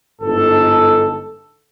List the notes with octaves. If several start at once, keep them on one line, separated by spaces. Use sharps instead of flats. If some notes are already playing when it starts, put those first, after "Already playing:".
G1 G#2 A4